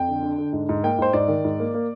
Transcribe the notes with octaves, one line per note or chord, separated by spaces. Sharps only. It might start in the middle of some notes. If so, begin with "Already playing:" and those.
Already playing: F2 G5
D3
D3
D3
G#2
G#2
A#3 G5
G#2 C5
G#2 D5
D#3
G#2
A#3
A#3